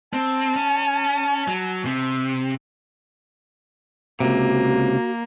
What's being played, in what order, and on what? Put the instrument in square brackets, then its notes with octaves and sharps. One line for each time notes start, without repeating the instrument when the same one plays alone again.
[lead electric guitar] C4 [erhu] A5
[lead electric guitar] C#4
F#3
C3
[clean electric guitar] C#2 C3 [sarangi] A#3 [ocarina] F#4